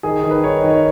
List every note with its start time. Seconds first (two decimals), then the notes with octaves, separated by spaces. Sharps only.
0.03 D#3 G#4
0.23 D#3
0.30 B4
0.44 D#4 C#5
0.57 D#5
0.64 D#3
0.70 C#5